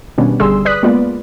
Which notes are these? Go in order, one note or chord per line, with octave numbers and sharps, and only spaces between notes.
B2 D#3 G3 B3 C#4 D4
G1 D3 G3 G#4 C6 E6
B4 D5 D#6 F#6 B6
G#3 A#3 B3 F4 B4 D5